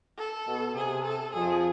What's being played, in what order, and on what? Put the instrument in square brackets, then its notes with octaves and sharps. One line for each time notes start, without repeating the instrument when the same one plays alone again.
[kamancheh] A4
[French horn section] B2
[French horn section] C3 [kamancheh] G#4
[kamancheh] A4
[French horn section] F2 F3 [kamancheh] G#4